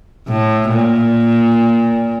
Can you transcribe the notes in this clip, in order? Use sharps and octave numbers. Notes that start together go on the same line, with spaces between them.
A2
A#2